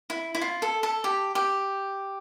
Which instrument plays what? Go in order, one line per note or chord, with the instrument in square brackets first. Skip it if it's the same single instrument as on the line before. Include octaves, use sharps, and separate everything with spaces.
[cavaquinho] E4
E4
F4
A4
A4
G4
G4